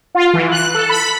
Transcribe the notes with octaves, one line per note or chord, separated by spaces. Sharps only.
F4
E3
F#6
A4
B5